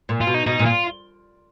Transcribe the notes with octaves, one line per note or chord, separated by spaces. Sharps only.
A#2
F4
B2
D#4
B2 D#4
A#2
F4